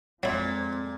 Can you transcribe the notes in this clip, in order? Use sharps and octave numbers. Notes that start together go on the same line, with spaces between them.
F2 A#2 F3 F#3 G#3 C4 E4